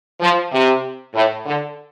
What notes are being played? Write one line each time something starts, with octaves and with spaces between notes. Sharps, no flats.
F3
C3
A2
D3